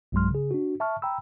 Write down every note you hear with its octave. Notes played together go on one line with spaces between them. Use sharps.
B1 G2 F#3 G#3 C6 F6
C#3 G#4
D4 F#4
E5 A5 C#6 F6
G5 A#5 B5 E6